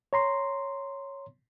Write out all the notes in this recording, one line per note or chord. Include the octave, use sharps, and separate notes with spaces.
C#5 A#5 C6